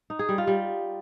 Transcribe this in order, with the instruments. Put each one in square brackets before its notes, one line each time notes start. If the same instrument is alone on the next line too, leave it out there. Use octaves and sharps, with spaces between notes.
[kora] D#4
G#4
G3
F4
G3